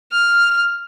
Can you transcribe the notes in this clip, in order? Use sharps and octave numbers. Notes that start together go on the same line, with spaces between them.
F6